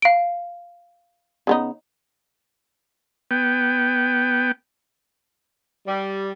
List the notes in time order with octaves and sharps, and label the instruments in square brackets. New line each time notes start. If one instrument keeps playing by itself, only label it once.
[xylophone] F5 D7
[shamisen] C#3 B3 D#4
[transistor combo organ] B3 G5
[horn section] G3